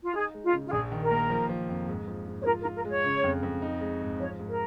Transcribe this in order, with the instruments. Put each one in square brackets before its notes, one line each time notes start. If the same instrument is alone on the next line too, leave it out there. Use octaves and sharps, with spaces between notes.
[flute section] F4
[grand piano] D#4 [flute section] G#4
[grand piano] G#3
[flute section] F4
[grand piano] C#3
[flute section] F4
[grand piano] A#1 [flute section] G#4
[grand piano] D#3
[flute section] A#4
[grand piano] A#3
F3
F3
F2
G#2
F3
G#2
[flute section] C#5
[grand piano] F4 [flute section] A#4
[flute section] A#4
[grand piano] F4
[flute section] A#4
[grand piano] G#3 [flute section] C#5
[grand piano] C#3
F2
F2
D#4
G#3
G#2
[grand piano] F3 [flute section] C#5
[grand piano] G#2
[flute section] A#4